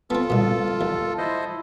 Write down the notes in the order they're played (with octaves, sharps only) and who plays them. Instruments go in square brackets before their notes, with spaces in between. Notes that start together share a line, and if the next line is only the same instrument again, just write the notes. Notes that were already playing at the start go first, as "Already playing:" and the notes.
[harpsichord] B3 C4 [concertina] F4 A4
[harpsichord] C2 A#2
D#2
[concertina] E4 C5 D#5